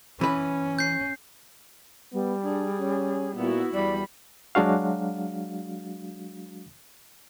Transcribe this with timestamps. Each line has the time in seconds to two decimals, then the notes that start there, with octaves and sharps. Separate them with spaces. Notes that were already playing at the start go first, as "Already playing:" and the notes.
0.21 E3 C#4 B4
0.79 G6 C7
2.13 G3 B3
2.44 D4 G#4
2.80 C#4
3.36 A#2 B3 E4 F#4
3.74 E2 G3 D5 B5
4.55 F#3 G#3 D4 F#4 F5